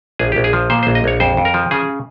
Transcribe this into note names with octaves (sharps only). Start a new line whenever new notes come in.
A#1 G#4
G4
A#1
G#4
F3
A#2 C5
C5
A#1
D#5
A#1 C#5
F2 C5
F2
A#4
F3
C#3 G#4